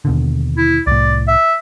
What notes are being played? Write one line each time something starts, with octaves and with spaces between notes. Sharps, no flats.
D#2 B2 D3
E4
C2 A2 D5
E5